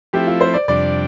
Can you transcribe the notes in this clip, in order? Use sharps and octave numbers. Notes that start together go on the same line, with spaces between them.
F3 A3 C4 E4 G4
F4
C5
D5
F2 C3 G3 D4 D5